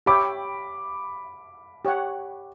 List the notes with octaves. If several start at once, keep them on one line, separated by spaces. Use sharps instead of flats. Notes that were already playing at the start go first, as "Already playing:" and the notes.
G4 C#5 E5 G5 B5 D6
G4 C#5 F#5